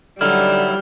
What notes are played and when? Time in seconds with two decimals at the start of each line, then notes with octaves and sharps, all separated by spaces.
0.21 D3 F#3 G3 D#4 E4 F6